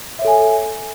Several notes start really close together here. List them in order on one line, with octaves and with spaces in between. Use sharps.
E5 C#5 A4 G#5